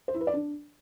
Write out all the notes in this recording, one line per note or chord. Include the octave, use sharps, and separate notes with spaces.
C5
E4
B4
D5
D4